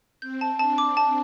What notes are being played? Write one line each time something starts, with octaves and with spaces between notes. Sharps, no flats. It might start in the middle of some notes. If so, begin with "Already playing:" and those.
C4 G6
A5
D4 A5
D6
A5